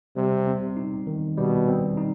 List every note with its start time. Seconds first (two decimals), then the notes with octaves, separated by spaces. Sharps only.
0.16 C3 G3
0.47 C4
0.77 D#4
1.07 D#3
1.37 B2 G3
1.68 C4
1.97 D#4